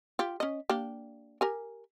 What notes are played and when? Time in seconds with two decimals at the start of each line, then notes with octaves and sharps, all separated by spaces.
0.19 F4 G4
0.40 C#4 D#5
0.70 A#3 D4 G4
1.41 G4 A#4 G#5